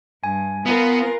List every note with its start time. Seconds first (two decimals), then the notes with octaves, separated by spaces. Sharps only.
0.24 G2 G#5
0.66 B3 F4 A#4 B4